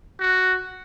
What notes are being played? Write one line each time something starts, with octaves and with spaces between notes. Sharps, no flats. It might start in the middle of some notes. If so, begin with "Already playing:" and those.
F#4